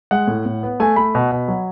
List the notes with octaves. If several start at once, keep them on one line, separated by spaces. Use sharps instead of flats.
G#3 F#5
A2
A2
B3
A3 G#5
A3 B5
B2
B2
F#3